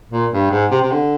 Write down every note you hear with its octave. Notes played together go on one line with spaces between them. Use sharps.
A#2
G2
G#2
C3
C3
D3